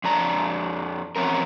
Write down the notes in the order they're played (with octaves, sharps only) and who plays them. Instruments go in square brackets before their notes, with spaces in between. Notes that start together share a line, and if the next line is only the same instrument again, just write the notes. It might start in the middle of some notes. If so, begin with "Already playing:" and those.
[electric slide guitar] F2 D4 A#5
E2 F3 C4 C#4 A#4